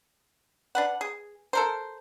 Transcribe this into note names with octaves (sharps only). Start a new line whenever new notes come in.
D4 B4 F#5
G#4
A4 A#4 C5